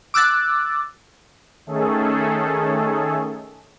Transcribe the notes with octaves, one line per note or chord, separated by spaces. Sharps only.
D6 E6 F#6 A6
D#3 A3 C#4 G#4 A4